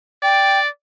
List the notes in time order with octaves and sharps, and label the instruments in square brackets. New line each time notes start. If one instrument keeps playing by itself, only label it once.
[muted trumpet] D5 [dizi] G5